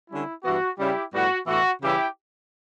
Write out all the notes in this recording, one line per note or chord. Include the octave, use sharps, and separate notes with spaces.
D3 G3 C#4 E4
G2 E3 B3 F#4
C#3 G3 C#4 E4 G4
A2 G3 B3 F#4
A2 E3 B3 F#4
C#3 E3 G3 C#4 E4 G4